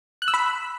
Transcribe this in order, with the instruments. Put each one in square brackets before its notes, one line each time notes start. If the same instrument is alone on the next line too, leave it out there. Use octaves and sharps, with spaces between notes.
[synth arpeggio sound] F#6
E6
B5